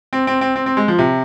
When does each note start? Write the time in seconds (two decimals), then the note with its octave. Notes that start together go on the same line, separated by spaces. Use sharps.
0.13 C4
0.27 C4
0.41 C4
0.56 C4
0.66 C4
0.77 G#3
0.88 F3
0.99 C3